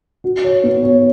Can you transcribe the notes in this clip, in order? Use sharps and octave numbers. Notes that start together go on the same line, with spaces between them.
F#4
C#5
B3
C#5